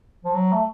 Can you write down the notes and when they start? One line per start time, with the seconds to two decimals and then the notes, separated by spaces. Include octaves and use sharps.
0.25 F3
0.35 F#3
0.53 A3